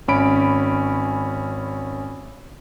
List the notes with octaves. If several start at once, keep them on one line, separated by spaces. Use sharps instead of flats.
G#1 C#4 B5 D7